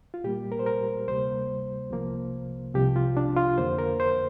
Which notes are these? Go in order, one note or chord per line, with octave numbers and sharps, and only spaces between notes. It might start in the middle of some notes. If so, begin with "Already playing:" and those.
F4
A#2 G3 A#3 G4
A#4
C5
A#4
D2 C3 G3 A#3 C5
C2 C3 F3 A#3
C2 C3 F3 G4
F4
D4
F4
F2 D3 A#3 C5
A#4
C5